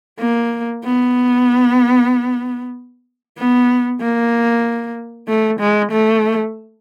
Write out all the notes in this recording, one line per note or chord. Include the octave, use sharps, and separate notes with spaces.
A#3
B3
B3
A#3
A3
G#3
A3